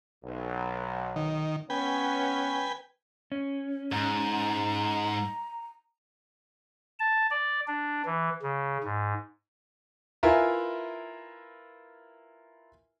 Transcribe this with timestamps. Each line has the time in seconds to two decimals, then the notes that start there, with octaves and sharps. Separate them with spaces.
0.25 B1
1.16 D#3
1.70 B3 C#4 B4 G5 G#5
3.32 C#4
3.92 G#2 A#5
7.00 A5
7.30 D5
7.67 D4
8.05 E3
8.43 C#3
8.84 G#2
10.23 E4 F4 A#4 B4 E5 G#5